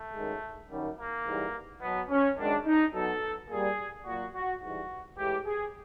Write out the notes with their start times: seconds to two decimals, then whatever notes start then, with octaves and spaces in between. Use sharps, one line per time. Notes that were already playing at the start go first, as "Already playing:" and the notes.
Already playing: A3
0.13 F#2 D#3 G#3
0.70 F#2 D#3 G3
0.97 A#3
1.26 G#2 E3 G3
1.81 B2 F#3 B3
2.10 C#4
2.37 F#2 D#3 G#3 D4
2.65 D#4
2.94 B2 F#3 A4
3.49 A#2 G3 G#4
4.05 A#2 F#4
4.10 F#3
4.33 F#4
4.61 G#2 E3 G3 F#4
5.17 A2 E3 G#3 G4
5.46 G#4